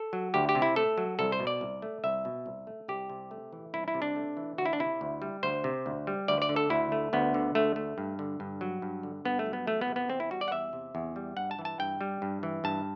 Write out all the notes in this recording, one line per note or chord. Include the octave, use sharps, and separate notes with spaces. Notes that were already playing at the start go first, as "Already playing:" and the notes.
Already playing: A4
F#3
D2 G4
G4
C3
E4
A3 A4
F#3
C2 A4
C5
B2
D5
C2
A3
C2 E5
B2
C2
A3
C2 G4
C3
A3
E3
C2 E4
E4
C3
D4
A3
E3
D2 F#4
E4
D4
C3 E4
D2
G3
D2 C5
C3
D2
G3
D2 D5
D5
D3
A4
D2 E4
A3
D2 B3
D3
D2 A3
A3
G2
D3
G2
F#3
G2
D3
G2 B3
A3
F#3
B3
E2 A3
B3
C3
B3
E2 C4
E4
G3 F#4
D5
F#5
E2 E5
C3
E2
G3
G2 F#5
A5
E3
A5
G2 G5
G3
G2
E3
G2 A5